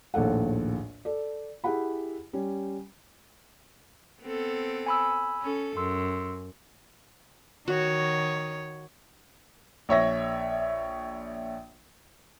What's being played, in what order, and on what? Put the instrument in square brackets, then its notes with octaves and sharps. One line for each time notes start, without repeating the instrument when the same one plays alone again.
[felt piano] A#1 D#2 A2 A4 F#5
A4 D5
E4 G4 G#4 F#5 B5
G3 C#4
[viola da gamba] B3 C4 A4
[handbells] G#5 B5 E6
[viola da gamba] C#4 A4
[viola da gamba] F#2 [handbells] C6 E6
[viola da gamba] D#3 C#5 [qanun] F#4
[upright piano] A#1 C#5 E5 A#6